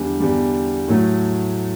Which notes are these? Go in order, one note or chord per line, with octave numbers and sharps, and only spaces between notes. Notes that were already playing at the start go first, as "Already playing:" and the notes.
Already playing: E2 D3 G3
E2 D3 G3
A2 F#3 A3